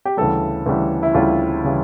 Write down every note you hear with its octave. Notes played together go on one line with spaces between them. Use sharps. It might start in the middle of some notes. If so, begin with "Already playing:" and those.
G4
D2 C#3 E3 G3 A4
D2 C#3 E3 G3
E4
D2 C#3 E3 G3 F4
C#3 E3 G3